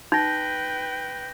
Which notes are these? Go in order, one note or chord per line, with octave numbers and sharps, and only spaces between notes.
D#4 B4 G5 G6 A#6